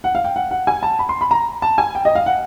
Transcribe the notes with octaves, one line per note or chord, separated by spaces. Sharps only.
F#5
F5
G5
F#5
F#5
G#5
A5
B5
C6
B5
A#5
A5
G#5
G5
D#5
F5
F#5